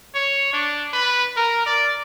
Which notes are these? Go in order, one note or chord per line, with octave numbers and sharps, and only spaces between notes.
C#5
D4
B4
A#4
D5